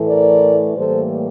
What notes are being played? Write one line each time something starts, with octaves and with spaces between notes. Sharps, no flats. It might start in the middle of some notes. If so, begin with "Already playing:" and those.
Already playing: A2 E3 A3
A#4 D5
A2 E3 G3 A#3 A4 C5